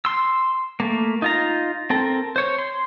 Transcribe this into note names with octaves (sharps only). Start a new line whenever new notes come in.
C6 E6
A3 A#3
D#4 F4 A#5
C4 A4 A#4
C5 C#5
C6